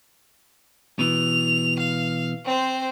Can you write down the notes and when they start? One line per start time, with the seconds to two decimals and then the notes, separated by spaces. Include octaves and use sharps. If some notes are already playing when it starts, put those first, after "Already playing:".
0.99 B2 E3 F7
1.79 F5
2.45 C4 C5